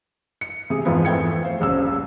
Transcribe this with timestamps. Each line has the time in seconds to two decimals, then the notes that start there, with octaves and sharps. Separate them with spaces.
0.41 C#7
0.70 C3 G#4
0.85 F2 G#2 E3 F3 B3
1.05 F2 E3 A3 G5 G#6 C#7
1.43 C5 F5
1.60 D#1 A#1 C#3 E6